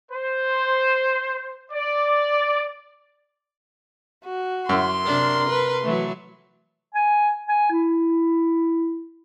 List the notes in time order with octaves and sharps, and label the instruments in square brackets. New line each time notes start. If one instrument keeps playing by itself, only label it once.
[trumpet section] C5
D5
[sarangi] F#4
[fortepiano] F#2 E4 [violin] C6
[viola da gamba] C3 D4 [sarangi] A#4
[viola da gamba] B4
[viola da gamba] E3 F#3 [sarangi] A3
[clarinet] G#5
G#5
E4